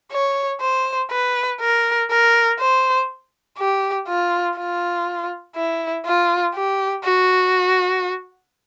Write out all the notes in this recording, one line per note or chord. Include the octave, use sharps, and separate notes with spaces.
C#5
C5
B4
A#4
A#4
C5
G4
F4
F4
E4
F4
G4
F#4